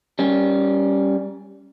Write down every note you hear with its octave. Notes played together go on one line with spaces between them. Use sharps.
G3 C#4